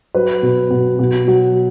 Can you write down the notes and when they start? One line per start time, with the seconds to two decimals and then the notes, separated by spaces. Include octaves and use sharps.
0.14 F#3 B4
0.42 B2
0.71 B2
0.99 B2
1.27 F#3